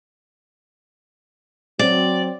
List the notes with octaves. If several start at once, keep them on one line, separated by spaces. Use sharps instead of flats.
F#3 C4 D5